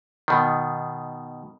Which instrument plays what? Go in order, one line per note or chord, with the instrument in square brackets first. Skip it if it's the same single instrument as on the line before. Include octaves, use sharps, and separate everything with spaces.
[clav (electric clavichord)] B2 D#3